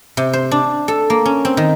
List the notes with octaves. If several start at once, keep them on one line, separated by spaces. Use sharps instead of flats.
C3
C5
D4
A4
A#3
C#4
C4
D#3